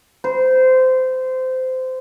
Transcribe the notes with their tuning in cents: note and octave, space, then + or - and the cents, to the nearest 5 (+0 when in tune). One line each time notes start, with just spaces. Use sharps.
C5 -20